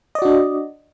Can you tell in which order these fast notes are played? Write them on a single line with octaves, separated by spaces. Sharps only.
D#5 D5 F#4 D4